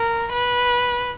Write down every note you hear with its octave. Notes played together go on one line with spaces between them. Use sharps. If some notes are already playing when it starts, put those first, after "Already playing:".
Already playing: A#4
B4